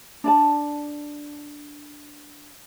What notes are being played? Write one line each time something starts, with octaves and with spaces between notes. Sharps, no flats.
D4 D5 A5